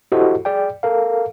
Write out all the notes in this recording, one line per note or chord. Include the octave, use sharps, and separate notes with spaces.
E4 F#4 G4 A4 C5 D#5
G#4 D5 G5
A4 A#4 F5